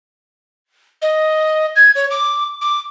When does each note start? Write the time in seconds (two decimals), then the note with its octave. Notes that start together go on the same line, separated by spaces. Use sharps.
1.02 D#5
1.76 G#6
1.95 C#5
2.11 D6
2.61 D6